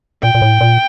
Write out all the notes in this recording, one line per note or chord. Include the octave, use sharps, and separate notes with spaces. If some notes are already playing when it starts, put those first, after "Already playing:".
A#2 G5
A#2
A2
A#2